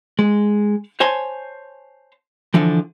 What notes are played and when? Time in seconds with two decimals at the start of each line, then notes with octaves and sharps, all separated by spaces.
0.19 G#3
1.00 C5 C#5 G#5 A5 C6
2.54 D3 E3 F3